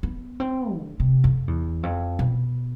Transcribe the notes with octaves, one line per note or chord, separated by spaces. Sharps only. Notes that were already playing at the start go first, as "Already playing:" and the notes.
B3
C4
D3
C3
F2
E2
F2
B2